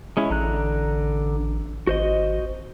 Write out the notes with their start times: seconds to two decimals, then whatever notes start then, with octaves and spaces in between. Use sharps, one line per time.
0.17 G#3 C#4 E4
0.30 A1 D3 A#5 F#6
1.87 G#1 F#4 C5 D#5